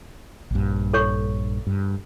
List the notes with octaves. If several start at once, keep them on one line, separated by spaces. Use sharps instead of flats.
A#1 G2
A4 C#5 C#6
G2